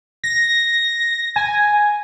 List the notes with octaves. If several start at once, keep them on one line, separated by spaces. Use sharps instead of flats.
A#6
G#5